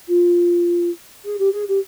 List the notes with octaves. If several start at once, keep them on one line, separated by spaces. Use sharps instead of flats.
F4
G#4
G4
G#4
G4